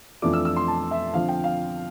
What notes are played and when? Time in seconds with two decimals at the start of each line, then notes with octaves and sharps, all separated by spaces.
0.22 F2 E3 A3 D4 F4 D6
0.33 E6
0.45 E6
0.56 C6
0.68 A5
0.91 E5
1.14 D3 F3 C4 F5
1.28 G5
1.44 F5